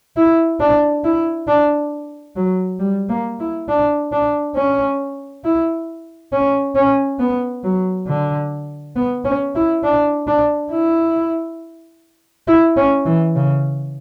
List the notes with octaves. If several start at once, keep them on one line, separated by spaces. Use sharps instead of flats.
E4
D4
E4
D4
F#3
G3
A#3
E4
D4
D4
C#4
E4
C#4
C#4
B3
F#3
D3
B3
C#4
E4
D4
D4
E4
E4
C#4
E3
C#3